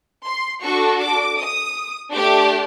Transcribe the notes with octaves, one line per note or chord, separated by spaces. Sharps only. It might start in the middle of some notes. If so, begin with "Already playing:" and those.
C6
D4 F#4 A4 C#6
D6
D#6
A3 D4 G4 D6